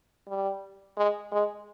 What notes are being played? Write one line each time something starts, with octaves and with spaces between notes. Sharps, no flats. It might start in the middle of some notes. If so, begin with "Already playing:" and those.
G3
G#3
G#3